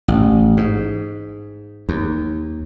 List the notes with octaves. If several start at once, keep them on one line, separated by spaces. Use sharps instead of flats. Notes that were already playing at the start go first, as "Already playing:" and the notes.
A1
G#2
D#2